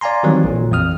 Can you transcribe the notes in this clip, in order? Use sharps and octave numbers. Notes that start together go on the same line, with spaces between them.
D5 F5 G#5 A#5 C6
D#3 E3 F#3 G3 C4
A#1 A#2
F2 E3 D#6 F6